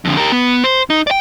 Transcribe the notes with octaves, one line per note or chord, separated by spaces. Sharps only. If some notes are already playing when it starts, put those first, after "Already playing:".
F2 D3
G4 A#4
B3
C5
D#4
D5 G5